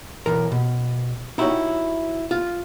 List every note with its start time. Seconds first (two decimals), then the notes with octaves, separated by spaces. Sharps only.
0.26 B1 E3 A#4
0.52 B2
1.38 D#4 E4 F#4 G4 C#5
2.31 F4